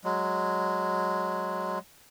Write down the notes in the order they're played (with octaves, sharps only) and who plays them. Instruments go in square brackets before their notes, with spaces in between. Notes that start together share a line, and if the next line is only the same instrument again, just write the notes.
[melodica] F#3 G#3